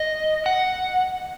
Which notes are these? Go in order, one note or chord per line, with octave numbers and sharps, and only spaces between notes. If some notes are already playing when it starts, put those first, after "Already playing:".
Already playing: D#5
F#5